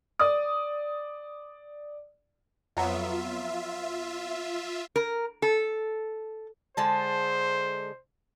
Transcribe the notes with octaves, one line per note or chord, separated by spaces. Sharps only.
D5 D#6
F2 F#3 B3 F4 E5
A#4
A4
D3 G#3 C5 A5